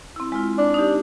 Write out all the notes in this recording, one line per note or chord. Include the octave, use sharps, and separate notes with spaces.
C4 E4
G#3 E4 F4
D4
D#4 G4